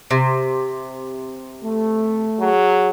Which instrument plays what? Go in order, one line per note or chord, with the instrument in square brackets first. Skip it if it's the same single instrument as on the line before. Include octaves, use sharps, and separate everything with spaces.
[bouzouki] C3
[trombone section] A3
[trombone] F#3 [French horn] G#4